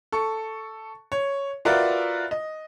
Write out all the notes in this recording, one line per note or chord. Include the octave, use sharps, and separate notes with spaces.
A4 C#6
C#5
F4 F#4 A#4 B4 D5 E5
D#5